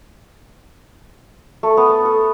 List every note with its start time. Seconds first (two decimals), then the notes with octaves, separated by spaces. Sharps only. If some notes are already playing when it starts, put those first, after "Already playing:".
1.63 A3
1.77 B3
1.89 A5
2.05 A4